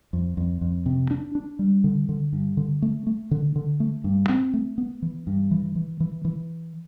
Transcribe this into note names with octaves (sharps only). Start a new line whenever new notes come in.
F2
F2
F2
C3
D4
D4
G3
D3
D3
G2
D3
A3
A3
D3
D3
A3
G2
C4
A3
B3
E3
G2
E3
E3
E3
E3